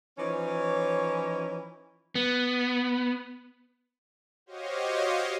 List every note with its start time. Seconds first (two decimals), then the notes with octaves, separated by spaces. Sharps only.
0.18 E3 F3 C#4 D#4 C#5
2.15 B3
4.46 F#4 G4 C5 C#5 D#5 F5